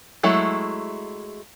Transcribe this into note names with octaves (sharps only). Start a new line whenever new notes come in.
F#3 G#3 A3 E4